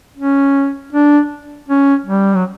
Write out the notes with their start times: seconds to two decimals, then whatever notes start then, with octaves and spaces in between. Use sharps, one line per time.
0.17 C#4
0.93 D4
1.68 C#4
2.06 G3
2.36 F#3